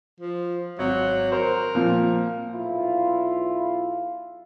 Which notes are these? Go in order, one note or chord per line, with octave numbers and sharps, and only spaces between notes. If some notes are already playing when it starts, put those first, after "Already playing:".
F3
G#1 F#3
A#4 C5
A#2 F3
B1 E4 F4